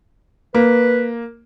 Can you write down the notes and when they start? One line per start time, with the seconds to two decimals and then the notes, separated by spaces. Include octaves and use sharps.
0.55 A#3 B4